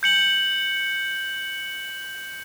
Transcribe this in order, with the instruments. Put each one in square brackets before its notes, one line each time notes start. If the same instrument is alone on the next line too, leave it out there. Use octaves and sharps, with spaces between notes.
[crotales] G6 C#7 F#7